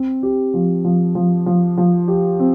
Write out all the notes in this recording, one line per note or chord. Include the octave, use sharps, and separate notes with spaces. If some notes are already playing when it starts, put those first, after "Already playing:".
Already playing: C4
G4
F3
F3
F3
F3
F3
G4
C4